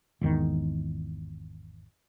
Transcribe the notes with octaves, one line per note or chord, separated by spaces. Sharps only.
G#1 E2 D#3